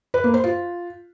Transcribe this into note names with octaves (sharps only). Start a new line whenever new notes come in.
B4
A#3
C5
F4